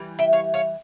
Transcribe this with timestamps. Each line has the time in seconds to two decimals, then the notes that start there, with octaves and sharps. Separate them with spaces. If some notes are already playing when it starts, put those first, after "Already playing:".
Already playing: E3 G3
0.19 E5 G5
0.33 C#5 F5
0.54 C#5 F5